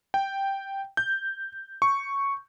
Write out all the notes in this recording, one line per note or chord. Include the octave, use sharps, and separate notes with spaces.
G5
G6
C#6